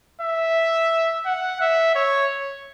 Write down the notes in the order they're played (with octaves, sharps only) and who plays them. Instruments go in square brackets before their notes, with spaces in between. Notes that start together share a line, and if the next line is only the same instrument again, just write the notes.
[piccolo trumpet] E5
F#5
E5
C#5